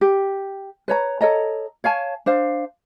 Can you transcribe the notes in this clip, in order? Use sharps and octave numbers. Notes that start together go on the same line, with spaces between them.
G4
B4 C#5 A#5
A4 C#5 D#5 A#5
C#5 F5 G#5 A5
D4 C5 F5